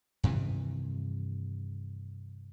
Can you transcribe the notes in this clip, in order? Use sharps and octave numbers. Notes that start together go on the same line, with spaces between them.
G2 C3 D#3 E3